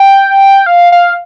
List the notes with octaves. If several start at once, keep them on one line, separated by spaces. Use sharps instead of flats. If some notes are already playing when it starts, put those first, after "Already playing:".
Already playing: G5
F5
F5